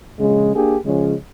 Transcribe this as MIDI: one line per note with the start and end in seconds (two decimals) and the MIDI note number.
0.18 0.51 34
0.18 0.51 49
0.18 0.51 56
0.55 0.76 58
0.55 0.76 62
0.55 0.76 67
0.55 0.76 68
0.85 1.14 49
0.85 1.14 53
0.85 1.14 56
0.85 1.14 61